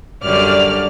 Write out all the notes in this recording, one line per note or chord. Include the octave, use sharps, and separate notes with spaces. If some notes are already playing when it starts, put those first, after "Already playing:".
F#2 D3 G3 D5 F6